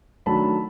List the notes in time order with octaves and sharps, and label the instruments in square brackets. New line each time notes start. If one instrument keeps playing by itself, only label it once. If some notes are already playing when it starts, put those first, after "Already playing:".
[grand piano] D#3 F#3 A3 D4 A5 B5